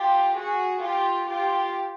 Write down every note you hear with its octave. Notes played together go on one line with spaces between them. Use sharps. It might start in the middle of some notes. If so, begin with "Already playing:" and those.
Already playing: F4 G4
F#4 G#4
F4 G4
F4 G4